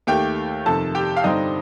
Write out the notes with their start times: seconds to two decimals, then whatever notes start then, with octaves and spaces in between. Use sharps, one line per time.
0.07 D#2 D#3 A3 G4 G5
0.66 F2 C3 D#3 A4 A5
0.95 G4 G5
1.17 F5
1.24 G2 D3 G3 C4 D#4 D#5